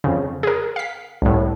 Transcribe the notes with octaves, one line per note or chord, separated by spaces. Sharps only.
F2 C#3
G#4 A#4
F5 B6
C2 A2